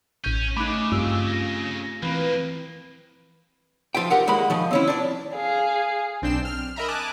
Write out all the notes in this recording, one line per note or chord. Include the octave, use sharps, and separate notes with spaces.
A1 C#4 G6
C#3 A3 D#4 B5 D6 F#6
G2 C4 F4 G4 E6
A#6
F2 E3 A#3 C4 B4
F3 F4 E5 G5
G4 A#4 F#5
D#2 G#3 A#3 B5
D#3 F3
C4 C#4 E4
D4 D5
G#4 F5
B1 C4 D4 G5 C7 E7
F6
A#4 D#5 E5 A#5 B5
G#5 A5 D6 D#6 F#6